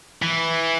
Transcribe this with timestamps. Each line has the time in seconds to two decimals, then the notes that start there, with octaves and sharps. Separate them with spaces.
0.22 E3